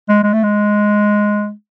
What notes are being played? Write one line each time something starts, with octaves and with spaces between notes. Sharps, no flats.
G#3
G#3
A3
G#3